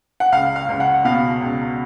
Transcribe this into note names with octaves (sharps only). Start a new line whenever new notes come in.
F#5
C#2 F5
F5
C#2
F#5
B2 F5
C#2